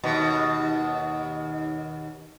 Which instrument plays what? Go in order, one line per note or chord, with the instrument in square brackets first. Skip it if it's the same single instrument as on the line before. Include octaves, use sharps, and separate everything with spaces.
[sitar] D#2 B2